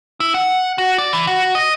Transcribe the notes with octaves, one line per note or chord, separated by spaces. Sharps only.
E4
F#5
F#4
D5
E3
F#4
D#5